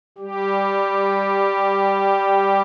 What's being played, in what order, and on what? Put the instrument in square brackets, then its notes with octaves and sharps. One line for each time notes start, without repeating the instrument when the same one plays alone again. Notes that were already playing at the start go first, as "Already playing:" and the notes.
[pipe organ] G3 G4